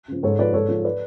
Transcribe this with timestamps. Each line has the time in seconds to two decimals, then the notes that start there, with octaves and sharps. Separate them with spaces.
0.08 C#3 F3
0.23 G#2 A4 C#5
0.39 F3 B4 D5
0.54 G#2 A4 C#5
0.69 F3
0.84 B4 D5